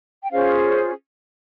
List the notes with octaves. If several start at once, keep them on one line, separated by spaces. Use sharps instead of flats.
G5
C#4 F4 G#4 C5 F5